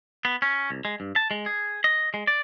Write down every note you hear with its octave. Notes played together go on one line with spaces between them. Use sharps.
B3
C#4
C2
G#3
G2
A5
G#3
G#4
D#5
G#3
D5